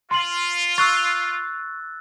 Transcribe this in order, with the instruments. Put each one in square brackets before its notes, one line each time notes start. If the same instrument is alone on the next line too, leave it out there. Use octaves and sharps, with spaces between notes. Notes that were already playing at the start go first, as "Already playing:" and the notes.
[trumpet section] F4 [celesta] C6 F#7
[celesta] C#6 [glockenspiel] E6 F#6 A6